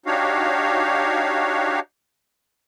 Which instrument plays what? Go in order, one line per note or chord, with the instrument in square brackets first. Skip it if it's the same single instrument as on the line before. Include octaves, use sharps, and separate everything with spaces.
[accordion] D4 D#4 F#4 G4 C#5 F5